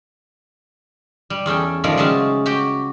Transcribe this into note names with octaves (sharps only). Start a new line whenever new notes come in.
G3
E2 C#4 A4 G5
D#3 F3 G3 A3 F4 A#4
C#3 F#3 G#3 C#4 A5
F#4 G4 G5